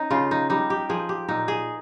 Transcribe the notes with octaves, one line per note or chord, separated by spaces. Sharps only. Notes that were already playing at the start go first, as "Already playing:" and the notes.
Already playing: C#4 D#4
C#3 F4
D#4
G3 D#4
G4
F3 G#4
G4
A#2 D#4
G#4